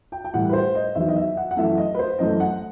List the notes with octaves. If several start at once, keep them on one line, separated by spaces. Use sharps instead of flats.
G5
G5
A2 E3 G3 F#5
B4
C5
D#5
E2 D#3 F#3 E5
D#5
E5
F#5
F#5
F#2 E3 A3 E5
D#5
B4
C5
F#2 E3 A3 D#5
F#5